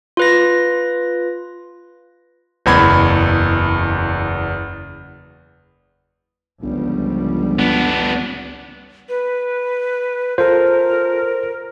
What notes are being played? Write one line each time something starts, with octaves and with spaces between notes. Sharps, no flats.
F4 B4 A#6
F#1 E2 B5 G#6
G1 C#2 F3 G3
B3 D4
B4
F4 A4 A#4 C5